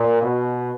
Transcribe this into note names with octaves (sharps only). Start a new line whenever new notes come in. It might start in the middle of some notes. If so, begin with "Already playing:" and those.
Already playing: A#2
B2